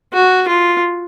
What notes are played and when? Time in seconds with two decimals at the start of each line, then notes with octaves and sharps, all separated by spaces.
0.13 F#4
0.48 F4